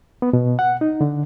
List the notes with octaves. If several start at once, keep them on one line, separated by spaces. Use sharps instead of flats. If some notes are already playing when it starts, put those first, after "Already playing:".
B3
B2
F#5
D#4
D3